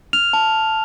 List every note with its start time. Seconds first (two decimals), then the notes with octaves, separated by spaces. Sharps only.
0.13 F6 F7
0.33 A5